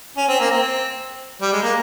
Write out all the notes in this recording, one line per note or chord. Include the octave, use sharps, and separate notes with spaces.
C#4
C4
A#3
C4
G3
G#3
A#3